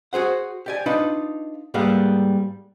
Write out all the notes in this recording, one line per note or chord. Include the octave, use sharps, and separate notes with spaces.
F#4 G#4 C5 F#5
G4 D5 G#5
D4 D#4 F4 B4
G#2 G3 A#3 B3 A4 F5